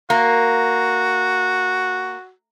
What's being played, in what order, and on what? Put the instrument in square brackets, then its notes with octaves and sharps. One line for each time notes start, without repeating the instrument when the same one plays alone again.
[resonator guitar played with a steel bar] A#3 [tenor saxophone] F#4